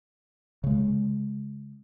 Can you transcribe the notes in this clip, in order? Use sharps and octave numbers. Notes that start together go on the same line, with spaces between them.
C#3 G#3